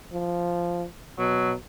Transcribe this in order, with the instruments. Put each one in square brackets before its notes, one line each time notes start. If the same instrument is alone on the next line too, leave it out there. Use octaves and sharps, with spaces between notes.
[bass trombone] F3
[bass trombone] B2 [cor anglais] F#3